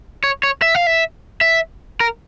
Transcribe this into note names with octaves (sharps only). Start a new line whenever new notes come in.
C#5
C#5
E5
F5
E5
E5
A#4